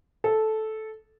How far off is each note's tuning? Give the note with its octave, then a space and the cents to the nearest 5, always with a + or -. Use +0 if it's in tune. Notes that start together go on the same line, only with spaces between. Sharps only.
A4 -10